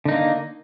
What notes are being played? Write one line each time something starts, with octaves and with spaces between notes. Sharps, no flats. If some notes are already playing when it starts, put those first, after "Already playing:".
D3 A#3 D#4